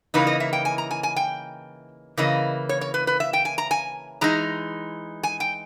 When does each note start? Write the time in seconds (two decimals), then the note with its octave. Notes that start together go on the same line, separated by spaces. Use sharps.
0.14 C#3 E3 A#3 D#4 B4
0.27 D#5
0.40 E5
0.53 G5
0.65 G#5
0.78 A#5
0.91 G#5
1.03 G#5
1.16 G5
2.17 C#3 E3 A#3 D#5
2.69 C#5
2.81 C#5
2.94 B4
3.07 B4
3.20 E5
3.33 G5
3.45 G#5
3.58 A#5
3.71 G#5
4.21 E3 G#3 D#4 A#5
5.23 G#5
5.40 G5